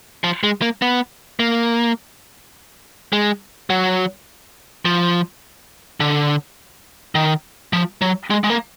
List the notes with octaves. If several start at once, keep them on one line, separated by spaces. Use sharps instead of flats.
F3
G#3
A#3
B3
A#3
G#3
F#3
F3
D3
D#3
F3
F#3
G#3
G#3
A#3